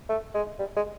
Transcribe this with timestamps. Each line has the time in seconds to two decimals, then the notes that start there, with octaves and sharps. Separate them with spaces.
0.09 A3
0.34 G#3
0.59 G3
0.77 G#3